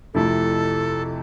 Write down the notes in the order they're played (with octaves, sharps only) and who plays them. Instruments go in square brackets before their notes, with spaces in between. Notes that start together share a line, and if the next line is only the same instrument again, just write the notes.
[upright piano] F2 C3 F3 A3 E4 [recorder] A4